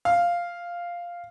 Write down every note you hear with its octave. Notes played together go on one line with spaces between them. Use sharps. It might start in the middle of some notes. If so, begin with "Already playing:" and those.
F5